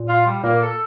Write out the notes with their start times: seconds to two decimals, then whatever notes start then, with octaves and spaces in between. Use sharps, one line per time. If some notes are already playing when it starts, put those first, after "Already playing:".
Already playing: A#2
0.08 F4
0.26 G3
0.43 A#2 A#3
0.61 A4